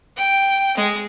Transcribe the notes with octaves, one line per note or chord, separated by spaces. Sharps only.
G5
G#3